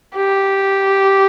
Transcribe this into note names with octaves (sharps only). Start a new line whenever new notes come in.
G4